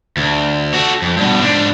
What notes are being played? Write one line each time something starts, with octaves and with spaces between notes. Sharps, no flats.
D2
F#4 A4
F2
G2 B2
G#2 D4